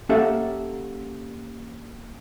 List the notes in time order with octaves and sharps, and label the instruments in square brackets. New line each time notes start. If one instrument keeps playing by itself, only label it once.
[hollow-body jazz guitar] A#3 C#4 G4 A4 E5 F#5